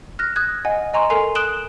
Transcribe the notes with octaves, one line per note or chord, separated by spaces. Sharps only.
F6 F#6 A#6
D#6 F#6 G#6
D#5 F#5 G#5
D#5 G#5 A#5 C6 C#6
A4 A#4 G#5 C6 C7 F7
D#6 F#6 D7 E7 F#7 G7